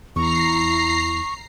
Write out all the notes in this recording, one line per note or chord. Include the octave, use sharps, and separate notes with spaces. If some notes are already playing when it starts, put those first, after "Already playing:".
E2 E4 A#5 C#6 C7